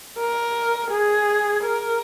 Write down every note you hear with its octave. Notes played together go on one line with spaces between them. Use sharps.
A#4
G#4
A#4